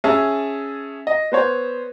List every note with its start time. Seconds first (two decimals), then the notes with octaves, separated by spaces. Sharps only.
0.04 C#4 G#4 E5 A5
1.07 D#5
1.32 B3 C5 C#5